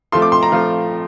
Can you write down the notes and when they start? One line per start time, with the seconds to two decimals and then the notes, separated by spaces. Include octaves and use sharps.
0.12 F3 A3 C4 F4 A4 C6
0.22 D6
0.32 C6
0.43 A#5
0.52 F3 A3 C4 F4 A4 F5